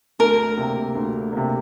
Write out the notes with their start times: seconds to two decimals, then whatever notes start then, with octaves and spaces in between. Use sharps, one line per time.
0.19 D2 A#4
0.57 C3 A#3
0.95 D2
1.33 C3 A#3